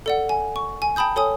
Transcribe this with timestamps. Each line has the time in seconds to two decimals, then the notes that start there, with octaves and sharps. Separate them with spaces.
0.06 A4 D5 F#5
0.29 G#5
0.56 C#6
0.82 G#5
0.96 G5 A5 B5 D#6 G6
1.16 A4 C#5 G#5 D#6